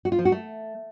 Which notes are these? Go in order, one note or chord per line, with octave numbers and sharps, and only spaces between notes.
F#4
F4
F3
F#4
A3